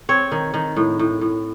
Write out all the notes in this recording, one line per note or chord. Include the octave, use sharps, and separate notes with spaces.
C4 C#5
D#3
D#3
A2
A2
A2